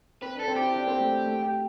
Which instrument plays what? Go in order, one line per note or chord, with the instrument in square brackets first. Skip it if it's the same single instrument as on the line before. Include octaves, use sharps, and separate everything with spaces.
[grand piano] C4 [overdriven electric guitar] B4
[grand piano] D4
[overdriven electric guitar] A4
[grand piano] C4
[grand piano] E4 [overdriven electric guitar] G4
[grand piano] D4
C4
A3
A3
G4